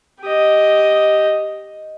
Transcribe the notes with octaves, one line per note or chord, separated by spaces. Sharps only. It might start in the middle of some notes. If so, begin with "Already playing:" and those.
G4 D#5